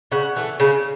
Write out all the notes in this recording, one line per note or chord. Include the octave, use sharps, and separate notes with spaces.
C#3 F#5
E3 A3
C#3